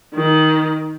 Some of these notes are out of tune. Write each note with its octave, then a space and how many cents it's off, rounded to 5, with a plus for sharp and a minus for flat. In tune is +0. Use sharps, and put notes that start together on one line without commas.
D#3 +10